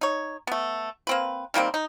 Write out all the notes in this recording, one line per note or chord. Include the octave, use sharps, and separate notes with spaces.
D#4 C#5
A3 B3
A#3 C4 B4
D#3 G3 A#3 C4
D#4